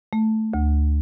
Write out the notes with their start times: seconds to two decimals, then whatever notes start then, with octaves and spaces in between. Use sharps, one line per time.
0.13 A3
0.54 D2